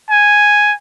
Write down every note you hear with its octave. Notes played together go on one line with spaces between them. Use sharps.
G#5